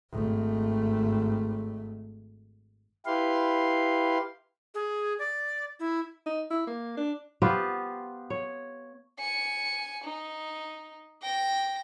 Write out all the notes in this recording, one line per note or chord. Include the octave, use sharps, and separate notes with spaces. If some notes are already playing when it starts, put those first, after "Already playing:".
G#1 A3
E4 G4 B4 F5 C6
G#4
D5
E4
D#4
E4
A#3
D4
B3 F4 G4 C5
C#5
G#5 C#7
D#4
G5 A#6